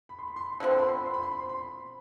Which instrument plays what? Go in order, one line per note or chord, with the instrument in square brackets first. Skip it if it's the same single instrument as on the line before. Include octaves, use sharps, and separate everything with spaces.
[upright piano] B5
C6
B5
C6
B5
C6
[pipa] D3 F3 C4 [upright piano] B5
[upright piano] C6
B5
C6
B5
C6
B5
C6
B5
C6
B5
B5